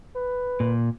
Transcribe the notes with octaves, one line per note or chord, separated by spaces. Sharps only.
B4
A#2